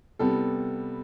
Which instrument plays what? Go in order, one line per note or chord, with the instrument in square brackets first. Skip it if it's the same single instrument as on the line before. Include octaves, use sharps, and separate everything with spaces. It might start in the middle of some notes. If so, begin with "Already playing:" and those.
[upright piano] C3 G3 B3 A4